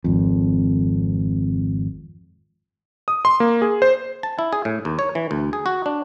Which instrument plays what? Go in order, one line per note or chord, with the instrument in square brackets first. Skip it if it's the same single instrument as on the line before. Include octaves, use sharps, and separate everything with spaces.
[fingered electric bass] G#1 F2
[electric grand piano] D#6
C6
A#3
G#4
C5
[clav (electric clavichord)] A5
E4
G#4
A2
D#2
C#5
E3
D2
G#4
F#4
D4